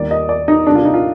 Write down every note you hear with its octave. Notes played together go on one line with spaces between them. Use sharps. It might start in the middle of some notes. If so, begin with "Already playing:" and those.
Already playing: D#2 D#3 G3 D5
D#5
D5
D#4
F2 C3 G3 D4
F4
D#4
F4